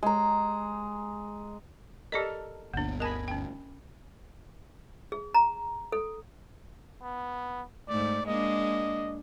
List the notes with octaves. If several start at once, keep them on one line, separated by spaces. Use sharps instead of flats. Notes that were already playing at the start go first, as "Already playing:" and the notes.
G#3 A#5
G4 A4 A#4 D5 D#5
G1 D2 A#3 B3 D4
A#4 D#5 G#5 A5 B5
C#4 G5
G#4
A#5
A4
B3
G#2 A3 D5
G#3 A#3 D4 D#5